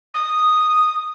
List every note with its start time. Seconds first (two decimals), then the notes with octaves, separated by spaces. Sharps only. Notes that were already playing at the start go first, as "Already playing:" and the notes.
0.14 D#6